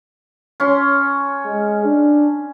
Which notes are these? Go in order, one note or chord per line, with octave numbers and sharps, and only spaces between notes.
C#4 C6
G#3
D4